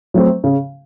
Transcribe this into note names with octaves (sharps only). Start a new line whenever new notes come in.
F#3 A3 C4
C#3